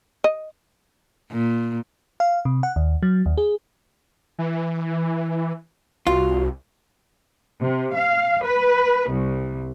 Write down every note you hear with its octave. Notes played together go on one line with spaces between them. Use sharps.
D#5
A#2
F5
C3
F#5
D#2
F#3
D#2
G#4
E3
C2 F4 F#4
C3
F5
B4
C2